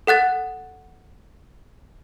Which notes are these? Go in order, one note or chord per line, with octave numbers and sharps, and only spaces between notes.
A4 F#5 F#6 A6